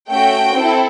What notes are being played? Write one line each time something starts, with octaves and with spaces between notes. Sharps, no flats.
A3 C#4 F#4 G5
C4 E4 A4